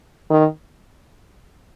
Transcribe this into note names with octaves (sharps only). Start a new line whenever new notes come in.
D#3